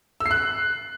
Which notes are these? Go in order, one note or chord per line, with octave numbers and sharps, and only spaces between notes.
E6
C7
F#6